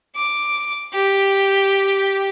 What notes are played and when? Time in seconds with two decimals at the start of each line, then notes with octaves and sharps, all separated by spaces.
0.16 D6
0.93 G4